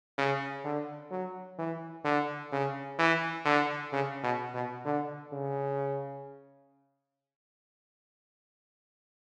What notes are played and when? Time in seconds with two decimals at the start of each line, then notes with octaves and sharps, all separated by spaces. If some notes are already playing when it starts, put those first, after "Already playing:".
0.18 C#3
0.64 D3
1.11 F#3
1.58 E3
2.05 D3
2.52 C#3
2.99 E3
3.45 D3
3.92 C#3
4.23 B2
4.54 B2
4.85 D3
5.32 C#3